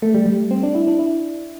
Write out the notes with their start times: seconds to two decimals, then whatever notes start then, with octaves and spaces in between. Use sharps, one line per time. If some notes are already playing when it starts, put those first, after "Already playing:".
0.02 A3
0.15 G3
0.26 G3
0.51 C4
0.63 D4
0.75 E4
0.87 D4
0.99 E4